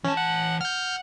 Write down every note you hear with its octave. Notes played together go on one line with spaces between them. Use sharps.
E3 C#4 A5
F#5
F#5 F6 G6